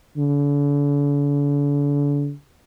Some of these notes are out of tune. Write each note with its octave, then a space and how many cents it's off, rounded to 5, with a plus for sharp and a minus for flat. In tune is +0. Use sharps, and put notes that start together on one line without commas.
D3 -40